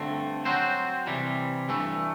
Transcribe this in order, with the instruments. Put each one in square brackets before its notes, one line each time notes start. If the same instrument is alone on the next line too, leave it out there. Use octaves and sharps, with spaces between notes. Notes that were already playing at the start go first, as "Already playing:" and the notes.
Already playing: [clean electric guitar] G2 D3 A3 C4
F#3 C4 F#4 C5
C3 E3 G3
G2 E3 A3